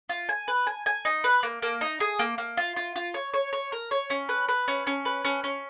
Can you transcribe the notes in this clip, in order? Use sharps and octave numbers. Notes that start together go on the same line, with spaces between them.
F4
G#5
B4
G#5
G#5
D#4
B4
A#3
A#3
D#4
G#4
A#3
A#3
F4
F4
F4
C#5
C#5
C#5
A#4
C#5
C#4
B4
B4
C#4
C#4
B4
C#4
C#4